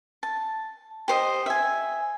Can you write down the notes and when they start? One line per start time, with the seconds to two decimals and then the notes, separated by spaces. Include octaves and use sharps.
0.23 A5
1.08 G4 C5 D#5
1.46 E5 G#5